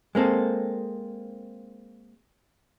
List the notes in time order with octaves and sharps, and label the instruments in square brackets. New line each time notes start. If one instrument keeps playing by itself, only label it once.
[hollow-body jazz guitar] G#3 A#3 C4 A4